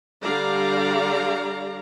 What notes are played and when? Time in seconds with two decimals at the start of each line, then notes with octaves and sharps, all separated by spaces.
0.22 D3 G3 G4 D5 F5 A#5